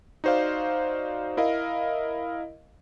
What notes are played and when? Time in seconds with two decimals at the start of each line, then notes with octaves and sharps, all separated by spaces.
0.24 D#4 F#4 C5 D5 F5
1.37 E4 A#4 D#5 F5